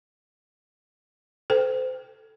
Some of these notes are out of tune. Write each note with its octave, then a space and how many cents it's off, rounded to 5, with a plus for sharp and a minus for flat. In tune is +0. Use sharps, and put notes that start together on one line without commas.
A4 +0 C5 -30 G5 +0